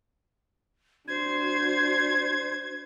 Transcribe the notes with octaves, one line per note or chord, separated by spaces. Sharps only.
D4 F#4 C5 G#6